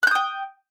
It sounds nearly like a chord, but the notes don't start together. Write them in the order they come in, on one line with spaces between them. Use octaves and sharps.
F#6 G6 D#6 G5